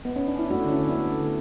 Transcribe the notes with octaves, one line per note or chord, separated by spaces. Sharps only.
B3
C#4
D4
E4
A3 D4 F#4
D3 C#4 E4
D3
A3 B3 D4
A3
D3